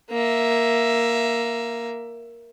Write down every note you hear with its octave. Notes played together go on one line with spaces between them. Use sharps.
A#3 E5